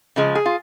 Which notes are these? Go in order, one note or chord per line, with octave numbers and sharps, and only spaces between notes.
C#3 F3 G#3
G#4
F4